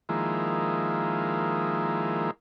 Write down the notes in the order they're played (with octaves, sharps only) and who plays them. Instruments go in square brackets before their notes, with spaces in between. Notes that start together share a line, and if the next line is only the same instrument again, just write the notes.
[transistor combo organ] D#3 F3 G#3 A#3 E4